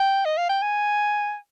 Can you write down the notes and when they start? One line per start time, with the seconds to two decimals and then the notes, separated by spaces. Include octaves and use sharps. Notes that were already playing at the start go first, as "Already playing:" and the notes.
Already playing: G5
0.25 D#5
0.38 F5
0.49 G5
0.62 G#5